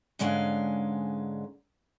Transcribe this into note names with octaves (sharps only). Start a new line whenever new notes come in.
G#2 D3 G#3 C#4 F5